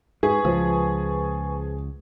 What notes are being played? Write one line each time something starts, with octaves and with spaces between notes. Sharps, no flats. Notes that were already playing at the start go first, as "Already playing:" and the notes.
G#2 G#4 B4 G#5 C#6
C#2 F3